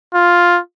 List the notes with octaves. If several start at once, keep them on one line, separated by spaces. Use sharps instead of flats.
F4